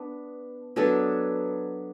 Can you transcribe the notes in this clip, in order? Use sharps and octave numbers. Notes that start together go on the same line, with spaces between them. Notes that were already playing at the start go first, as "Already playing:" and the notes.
Already playing: B3 D4
F#3 B3 D4 A4